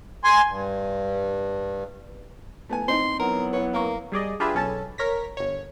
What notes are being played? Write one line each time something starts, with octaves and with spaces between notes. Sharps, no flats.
G#5 C6
G2
A3 B3 G#5
C4 D#4 C6
E3 F#3 B3 A#4
B4 C#5 F#5
A#3 A#4 C#6
G3 G#4 D5 D#5
D4 F4 G4 G#4 B4 E5
B1 C#4 A4 A5
A#4 C#5 A#6 B6
G1 C#5